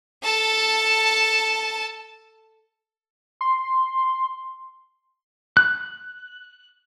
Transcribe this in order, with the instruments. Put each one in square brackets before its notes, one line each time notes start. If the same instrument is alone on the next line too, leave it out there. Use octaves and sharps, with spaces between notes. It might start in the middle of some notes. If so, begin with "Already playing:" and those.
[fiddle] A4 A5
[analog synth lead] C6
[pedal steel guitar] F#6